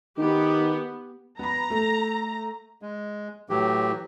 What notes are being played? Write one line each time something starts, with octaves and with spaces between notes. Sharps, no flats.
D#3 B3 G4
B3 A#5 B5
A3
G#3
A2 E3 F#3 G4